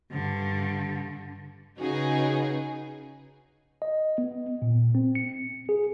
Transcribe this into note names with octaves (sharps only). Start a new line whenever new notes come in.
G2 D3
C#3 D#4 F#4 G#4 B4
D#5
B3
A#2
C4
C#7
G#4